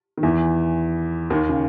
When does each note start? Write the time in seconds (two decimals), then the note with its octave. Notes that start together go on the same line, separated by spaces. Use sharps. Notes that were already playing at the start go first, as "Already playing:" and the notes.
0.18 D#3
0.23 E2 E3
1.30 D#2 D#3
1.49 C#3